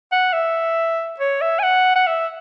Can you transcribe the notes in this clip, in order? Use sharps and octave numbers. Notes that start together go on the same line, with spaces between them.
F#5
E5
C#5
E5
G#5
F#5
F#5
E5